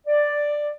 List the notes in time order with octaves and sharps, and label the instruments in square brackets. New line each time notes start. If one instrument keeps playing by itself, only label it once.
[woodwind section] D5